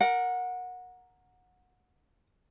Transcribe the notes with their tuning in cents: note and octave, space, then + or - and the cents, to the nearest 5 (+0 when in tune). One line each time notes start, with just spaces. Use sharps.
A#4 +5 F#5 -20